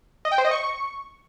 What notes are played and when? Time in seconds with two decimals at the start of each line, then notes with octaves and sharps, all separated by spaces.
0.25 D#5
0.32 G5
0.38 C5
0.45 D#5
0.51 C#6